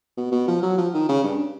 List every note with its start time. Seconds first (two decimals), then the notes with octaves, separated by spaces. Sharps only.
0.17 B2
0.32 B2
0.48 F3
0.62 F#3
0.78 F3
0.94 D#3
1.09 C#3
1.24 G2